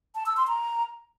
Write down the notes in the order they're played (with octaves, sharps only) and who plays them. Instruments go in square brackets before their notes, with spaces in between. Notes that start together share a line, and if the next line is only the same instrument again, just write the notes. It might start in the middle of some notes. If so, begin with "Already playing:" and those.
[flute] A5
E6
C6
A#5